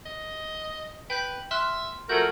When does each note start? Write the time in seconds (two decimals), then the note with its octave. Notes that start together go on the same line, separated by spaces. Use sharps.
0.06 D#5
1.10 B4 G5 G6 B6
1.51 E5 C6 F6 F#6
2.09 F3 A3 F#4 A#4 G6 G#6